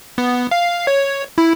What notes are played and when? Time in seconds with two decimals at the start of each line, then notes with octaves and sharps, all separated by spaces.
0.18 B3
0.51 F5
0.87 C#5
1.38 E4